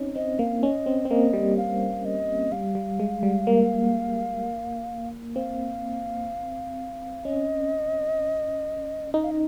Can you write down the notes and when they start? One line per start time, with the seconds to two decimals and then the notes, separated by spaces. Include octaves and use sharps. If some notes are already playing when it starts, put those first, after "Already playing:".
Already playing: C4 C#4 D#4
0.16 C4 D#5
0.39 A#3 F5
0.63 C#4 D#5
0.86 C4
1.05 C4
1.10 A#3 D#5
1.33 G3
1.57 F5
2.05 D#5
2.52 G3 F5
2.75 G3
3.00 G#3
3.23 G3
3.47 A#3
5.36 C4 F5
7.25 C#4 D#5
9.14 D#4 D#5
9.24 F5
9.31 D#5